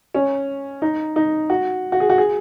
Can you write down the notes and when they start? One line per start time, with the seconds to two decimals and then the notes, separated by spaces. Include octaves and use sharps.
0.14 C#4
0.82 D#4
1.16 D#4
1.50 F#4
1.92 F#4
2.00 G#4
2.10 F#4
2.18 G#4